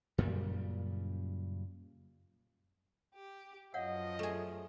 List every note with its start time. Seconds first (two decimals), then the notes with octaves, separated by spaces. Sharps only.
0.18 F#2 A#2 C#3 G3
3.13 G4
3.74 F#2 F3 C#5 D#5 F5 F#5
4.19 A3 G#4